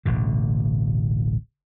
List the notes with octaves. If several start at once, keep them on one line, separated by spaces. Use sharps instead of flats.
D1 A1 B2 D3